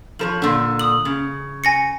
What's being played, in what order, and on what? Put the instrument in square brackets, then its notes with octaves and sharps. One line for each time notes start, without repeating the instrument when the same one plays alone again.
[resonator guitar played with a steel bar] F3 A#4 C#5 [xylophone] F#7
[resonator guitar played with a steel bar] A#2 D3
[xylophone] D#6 F#7
[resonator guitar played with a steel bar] C#3
[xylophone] G#5 A#6 C#7